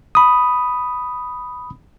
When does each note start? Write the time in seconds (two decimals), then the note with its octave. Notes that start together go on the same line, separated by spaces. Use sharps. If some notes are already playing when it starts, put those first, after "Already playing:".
0.15 B5 D#6